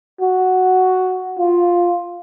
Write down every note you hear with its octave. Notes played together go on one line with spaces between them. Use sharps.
F#4
F4